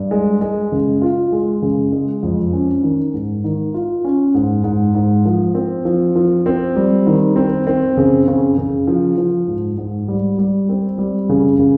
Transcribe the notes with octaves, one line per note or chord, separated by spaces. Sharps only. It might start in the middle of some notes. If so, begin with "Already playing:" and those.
Already playing: G2
G#3
G#3
C#3
F4
G#3
C#3
G#3
F2
C#4
D#3
G#2
D#3
F4
C#4
G#2
G#2
G#2
F3
C4
F3
F3
C4
G3
D#3
C4
C4
C#3
C#3
C#3
F3
F3
G#2
G#2
G3
G3
C4
G3
C#3
C#3